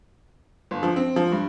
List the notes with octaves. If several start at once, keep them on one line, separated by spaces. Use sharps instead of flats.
G1
F3
C4
F3
G2